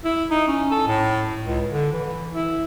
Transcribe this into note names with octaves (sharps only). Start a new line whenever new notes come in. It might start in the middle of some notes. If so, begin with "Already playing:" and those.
E4
D#4
C#4
A4
A2
C#2
D3
E3
E4